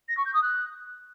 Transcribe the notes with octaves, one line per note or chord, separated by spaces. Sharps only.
A#6
C#6
G6
D#6
F#6